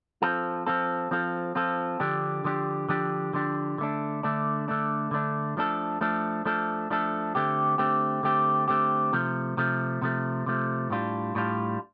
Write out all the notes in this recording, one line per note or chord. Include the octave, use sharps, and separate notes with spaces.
F3 C4 F4 A4
F3 C4 F4 A4
F3 C4 F4 A4
F3 C4 F4 A4
D3 F3 D4 G4
D3 F3 D4 G4
D3 F3 D4 G4
D3 F3 D4 G4
D3 A3 D4
D3 A3 D4
D3 A3 D4
D3 A3 D4
F3 A3 D4 A4
F3 A3 D4 A4
F3 A3 D4 A4
F3 A3 D4 A4
D3 A3 C4 G4
D3 A3 C4 G4
D3 A3 C4 G4
D3 A3 C4 G4
C3 F3 A3
C3 F3 A3
C3 F3 A3
C3 F3 A3
A2 G3 D4 F4
A2 G3 D4 F4